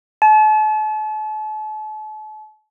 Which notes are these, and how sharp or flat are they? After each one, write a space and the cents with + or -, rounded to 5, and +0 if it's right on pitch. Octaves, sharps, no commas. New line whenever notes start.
A5 -40